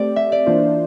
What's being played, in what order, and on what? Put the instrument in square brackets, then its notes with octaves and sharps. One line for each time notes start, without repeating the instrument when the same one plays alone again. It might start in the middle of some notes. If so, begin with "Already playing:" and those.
Already playing: [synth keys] A3 C4 G4 [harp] D5
[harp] E5
D5
[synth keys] E3 A#3 D4 F4 C5